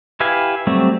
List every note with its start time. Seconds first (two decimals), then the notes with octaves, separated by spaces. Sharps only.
0.20 E4 G4 B4 F5 G#5
0.67 F#3 G3 A3 C4